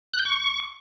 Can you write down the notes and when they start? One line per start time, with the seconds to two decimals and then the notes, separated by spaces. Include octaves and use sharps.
0.14 F#6
0.19 G6
0.25 C#6